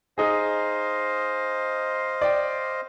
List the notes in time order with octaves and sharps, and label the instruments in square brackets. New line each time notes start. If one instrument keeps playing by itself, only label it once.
[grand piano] D#4 G#4 [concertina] C5 D#5 F5
[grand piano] D5 G5